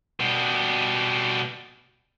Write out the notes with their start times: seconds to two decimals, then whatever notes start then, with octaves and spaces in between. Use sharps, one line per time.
0.20 B2 G3